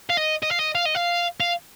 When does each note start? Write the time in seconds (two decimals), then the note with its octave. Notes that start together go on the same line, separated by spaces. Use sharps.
0.10 F5
0.17 D#5
0.43 D#5
0.51 F5
0.59 D#5
0.75 F5
0.85 D#5
0.95 F5
1.40 F5